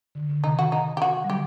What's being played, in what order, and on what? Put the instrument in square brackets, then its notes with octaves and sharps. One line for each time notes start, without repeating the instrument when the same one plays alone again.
[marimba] D3
D3
[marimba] C3 D#3 [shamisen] D#4
[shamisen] F#4
D#4
G4
F#4
[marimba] G3
[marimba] D3 F#3 [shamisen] G4